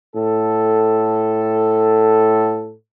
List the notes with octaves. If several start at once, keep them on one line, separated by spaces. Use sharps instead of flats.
A2 A4